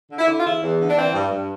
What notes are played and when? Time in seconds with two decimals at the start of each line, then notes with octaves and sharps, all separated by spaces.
0.10 D3
0.19 E4
0.28 D3
0.38 F4
0.45 E2 E4
0.62 E2
0.80 D3
0.88 D4
0.97 E3 C4
1.14 G2
1.31 G2